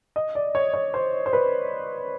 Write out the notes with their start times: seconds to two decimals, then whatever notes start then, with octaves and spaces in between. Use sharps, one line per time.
0.16 D#5
0.35 D5
0.55 C#5
0.74 C#5
0.94 C5
1.26 C5
1.33 B4